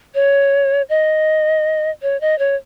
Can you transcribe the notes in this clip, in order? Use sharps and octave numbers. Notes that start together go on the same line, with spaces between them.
C#5
D#5
C#5
D#5
C#5